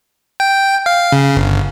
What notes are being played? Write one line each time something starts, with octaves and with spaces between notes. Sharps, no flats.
G5
F5
C#3
G1